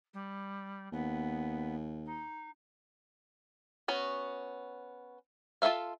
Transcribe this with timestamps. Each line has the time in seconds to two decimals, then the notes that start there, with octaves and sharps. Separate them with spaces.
0.14 G3
0.93 D#2 B3
2.05 D#4
3.88 B3 C#4 F#4
5.62 F4 F#4 A4 E5 F5